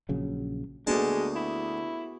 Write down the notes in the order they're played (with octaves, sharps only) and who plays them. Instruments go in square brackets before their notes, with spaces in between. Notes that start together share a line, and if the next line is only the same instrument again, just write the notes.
[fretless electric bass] A#1 C#3 F#3
[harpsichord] D2 A5 [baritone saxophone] G#3 [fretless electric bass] A#3 D4 [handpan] B3 F#4 G#4
[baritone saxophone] E4